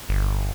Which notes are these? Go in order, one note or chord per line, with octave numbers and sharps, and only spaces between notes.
G1